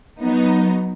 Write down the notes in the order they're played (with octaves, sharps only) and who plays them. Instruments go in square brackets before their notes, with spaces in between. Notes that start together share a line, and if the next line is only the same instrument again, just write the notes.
[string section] F#3 B3 D#4